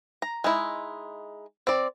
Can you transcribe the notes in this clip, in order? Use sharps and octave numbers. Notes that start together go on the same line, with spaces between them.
A#5
G#3 D#4 E4
C4 D5